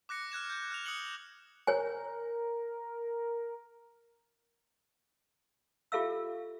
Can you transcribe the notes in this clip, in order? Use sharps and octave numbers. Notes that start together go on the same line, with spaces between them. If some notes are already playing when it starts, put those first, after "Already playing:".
D6 F#6 A#6 C#7
F6 F#6 G#6 E7
G6 G#6
F6 F#6 E7 F7
D#6 F#6 C#7 F#7 G7
A#4 C#5 G#5
F4 G4 A4 E5 F5 E6